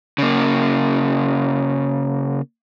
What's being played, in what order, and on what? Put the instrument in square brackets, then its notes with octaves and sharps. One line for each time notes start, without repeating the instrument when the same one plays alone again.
[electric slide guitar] C#3 A#3